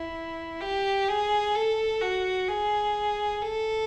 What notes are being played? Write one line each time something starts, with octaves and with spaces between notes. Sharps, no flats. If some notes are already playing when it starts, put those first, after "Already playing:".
Already playing: E4
G4
G#4
A4
F#4
G#4
A4